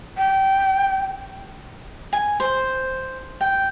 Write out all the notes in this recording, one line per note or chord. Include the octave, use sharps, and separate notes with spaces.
G5
G#5
C5
G5